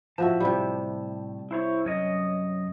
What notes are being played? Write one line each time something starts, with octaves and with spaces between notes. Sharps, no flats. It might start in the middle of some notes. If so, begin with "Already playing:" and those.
A2 F3 F#4 E5 A5
C3 G3
E4 C5 C#5
F#2 C#5 D#5